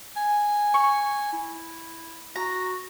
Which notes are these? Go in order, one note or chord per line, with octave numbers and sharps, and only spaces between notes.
G#5
C#6
E4
F#4 A#5